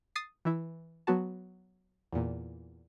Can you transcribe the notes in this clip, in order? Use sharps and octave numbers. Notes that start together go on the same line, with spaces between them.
D#6 A6 C7
E3 E4
F#3 B3 F#4 A5
E2 A#2